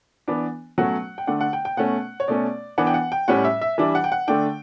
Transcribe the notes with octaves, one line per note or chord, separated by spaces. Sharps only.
E3 B3 D4
B2 F#3 A3 C#4 F#5
G5
D3 A3 D4 F#5
F#5
G5
G5
B2 A3 C#4 F#5
C#5
B2 A3 C#4 D5
E3 B3 D4 F#5
G5
F#5
G5
A2 G3 C#4 F#5
E5
E5
E3 G3 D4 E5
F#5
G5
F#5
D3 A3 D4 G5